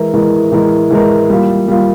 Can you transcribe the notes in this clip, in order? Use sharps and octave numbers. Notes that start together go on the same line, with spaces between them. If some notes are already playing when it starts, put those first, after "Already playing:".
Already playing: E3 G#3 E4 A#4
E3 G#3 E4 A#4
E3 G#3 E4 A#4
E3 G#3 E4 A#4
G3 A#3 F4
G3 A#3 F4